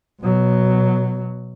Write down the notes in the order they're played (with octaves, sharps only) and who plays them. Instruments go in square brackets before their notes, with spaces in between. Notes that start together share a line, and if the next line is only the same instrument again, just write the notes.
[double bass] B2 F#3